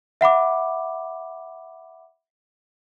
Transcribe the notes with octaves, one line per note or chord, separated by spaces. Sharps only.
E5 F#5 B5 D6